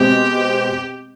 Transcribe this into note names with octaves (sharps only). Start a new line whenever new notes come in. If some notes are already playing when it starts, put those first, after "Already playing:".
Already playing: B2 G#3 C4 G4